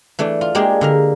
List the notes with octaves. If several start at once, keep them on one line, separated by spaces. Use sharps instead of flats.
E3 A3 D4
F4
G#3 A#3 D4 G4 G#4
D3 A#4 A#5